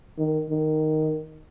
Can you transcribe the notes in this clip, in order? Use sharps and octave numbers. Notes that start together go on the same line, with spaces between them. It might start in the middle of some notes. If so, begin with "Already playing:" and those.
D#3
D#3